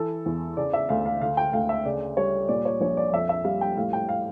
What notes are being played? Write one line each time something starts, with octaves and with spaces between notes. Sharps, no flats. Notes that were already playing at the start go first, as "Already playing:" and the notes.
Already playing: E3 A4
E2
C#3 D5
E5
D2 F5
F5
D3 F5
G5
D2 F5
E5
C#3 D5
G3 C#5
A#2 D5
C#5
A#1 C#5
D5
F2 E5
E5
G3 F5
G5
A2 F5
G5
F5